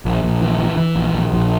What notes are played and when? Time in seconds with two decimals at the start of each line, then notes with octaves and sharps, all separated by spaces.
0.05 A#1
0.23 A#1
0.41 E3
0.59 E3
0.77 E3
0.96 A#1
1.13 A#1
1.32 A#1